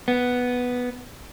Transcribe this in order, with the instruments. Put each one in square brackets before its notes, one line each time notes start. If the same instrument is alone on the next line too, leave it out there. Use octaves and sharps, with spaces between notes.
[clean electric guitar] B3